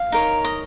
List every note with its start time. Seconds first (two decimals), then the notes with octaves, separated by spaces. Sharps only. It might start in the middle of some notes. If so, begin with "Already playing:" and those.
Already playing: F5
0.12 D#4 A#4 C#5
0.45 D#5